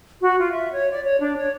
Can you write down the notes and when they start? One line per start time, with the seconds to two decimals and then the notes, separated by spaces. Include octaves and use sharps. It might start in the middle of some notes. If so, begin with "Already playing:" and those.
0.20 F#4
0.38 F4
0.51 E5
0.72 C#5
0.90 D5
1.04 C#5
1.19 D4
1.36 C#5